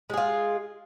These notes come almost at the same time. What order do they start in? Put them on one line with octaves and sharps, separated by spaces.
G#3 G#4 F4